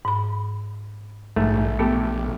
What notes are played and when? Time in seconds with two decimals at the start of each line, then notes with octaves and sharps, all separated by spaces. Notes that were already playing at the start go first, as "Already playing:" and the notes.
0.05 G#2 B5
1.36 A#1 G#2 A3
1.79 A3 B3 G4 A4